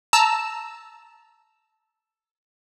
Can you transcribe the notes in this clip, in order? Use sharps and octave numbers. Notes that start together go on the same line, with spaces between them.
A5 A#5 E6 E7